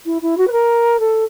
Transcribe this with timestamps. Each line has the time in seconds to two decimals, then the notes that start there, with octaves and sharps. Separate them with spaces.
0.06 E4
0.22 E4
0.37 F#4
0.47 B4
0.52 A#4
0.99 A4